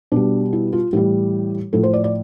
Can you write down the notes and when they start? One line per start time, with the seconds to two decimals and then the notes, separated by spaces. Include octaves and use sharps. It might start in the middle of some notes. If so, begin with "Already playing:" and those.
0.12 B2 G3 D4
0.53 E4
0.73 F4
0.93 A2 E3 G3 G4
1.73 A2 F3 A4
1.83 C5
1.93 D5
2.04 D5